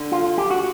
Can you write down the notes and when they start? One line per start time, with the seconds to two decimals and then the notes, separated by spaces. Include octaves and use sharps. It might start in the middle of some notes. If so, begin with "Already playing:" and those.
Already playing: D3
0.12 F4
0.38 G4
0.50 F#4